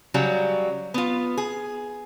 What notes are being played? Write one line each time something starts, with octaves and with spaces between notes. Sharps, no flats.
C#3 F#3 G3
B3 F4
G#4